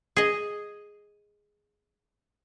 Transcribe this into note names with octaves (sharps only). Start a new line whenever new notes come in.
G#4 D#5